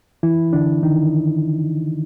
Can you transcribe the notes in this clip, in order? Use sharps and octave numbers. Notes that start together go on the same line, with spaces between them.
E3 E4
D3 D4
D#3 D#4